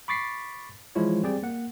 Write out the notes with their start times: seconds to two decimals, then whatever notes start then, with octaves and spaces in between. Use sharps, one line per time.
0.08 B5 C#6 D6 A6 B6 C7
0.95 E3 F3 G#3 E4 F4 C#5
1.23 G3 C4 G4 G#4 D5 G5
1.43 A#3 F#5